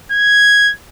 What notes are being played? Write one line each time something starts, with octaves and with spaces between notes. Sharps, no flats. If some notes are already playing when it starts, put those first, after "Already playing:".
G#6